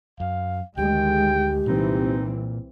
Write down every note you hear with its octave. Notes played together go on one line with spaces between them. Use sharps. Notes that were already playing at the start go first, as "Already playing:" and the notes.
F#2 F5
D2 D#3 G#3 G4 G5
C2 A#2 E3 C4 D#4